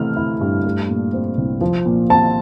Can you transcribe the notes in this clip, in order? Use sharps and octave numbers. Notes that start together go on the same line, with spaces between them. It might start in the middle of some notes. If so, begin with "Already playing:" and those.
Already playing: C3 E3 A3 F6
E4
G2
A3
A#2
C4
C2
F3
A#2
C4 A5